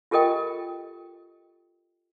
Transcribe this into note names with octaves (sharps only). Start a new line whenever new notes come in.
F4 G4 A4 A#4 D#5 G5